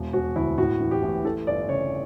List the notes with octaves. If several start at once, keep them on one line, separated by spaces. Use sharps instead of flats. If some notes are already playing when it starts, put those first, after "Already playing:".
Already playing: E1
E1 F#4
D2 E4
A2 F#4
E3
G4
A1
E3 A4
G1 D5
C#3 C#5